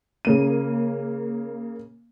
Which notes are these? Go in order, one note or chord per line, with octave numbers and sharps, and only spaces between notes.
C#3 A#3 D#7